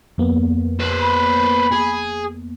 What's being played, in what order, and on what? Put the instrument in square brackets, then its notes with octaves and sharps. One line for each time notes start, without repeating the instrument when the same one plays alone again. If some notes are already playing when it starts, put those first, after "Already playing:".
[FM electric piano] F2 A#3 B3
[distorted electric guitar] B4 C5
[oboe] B5
[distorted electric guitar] G#4